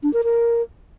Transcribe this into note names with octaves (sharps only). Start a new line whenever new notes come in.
D4
A#4
A#4